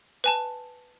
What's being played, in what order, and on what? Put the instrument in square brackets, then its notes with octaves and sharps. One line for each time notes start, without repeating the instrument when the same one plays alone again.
[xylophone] B4 G#5 A5